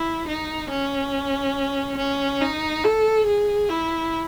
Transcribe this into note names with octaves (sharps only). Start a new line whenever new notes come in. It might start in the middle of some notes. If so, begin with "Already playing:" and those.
Already playing: E4
D#4
C#4
C#4
D#4
A4
G#4
E4